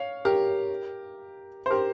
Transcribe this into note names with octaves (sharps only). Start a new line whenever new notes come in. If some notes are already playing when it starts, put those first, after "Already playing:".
Already playing: C#5 F5
G4 A#4
C5
G4 A#4